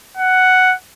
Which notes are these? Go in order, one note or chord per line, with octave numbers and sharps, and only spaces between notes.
F#5